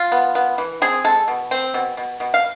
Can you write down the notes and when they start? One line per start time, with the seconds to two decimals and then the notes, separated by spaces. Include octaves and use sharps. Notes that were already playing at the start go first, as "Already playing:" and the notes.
Already playing: F4
0.12 B3
0.35 B3
0.58 E3
0.82 C4 G#4
1.04 G#3 A4
1.28 B2
1.51 C4
1.74 B2
1.97 B2
2.20 B2
2.34 F5